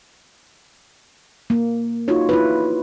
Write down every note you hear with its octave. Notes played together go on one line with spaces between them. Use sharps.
A#3
D#4 F4 F#4 C#5
E4 F4 B4